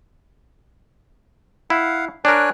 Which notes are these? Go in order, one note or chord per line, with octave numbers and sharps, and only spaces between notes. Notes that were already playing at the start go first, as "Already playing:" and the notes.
E4 F5 F#5
D4 A#4 C#5 G#5 F#6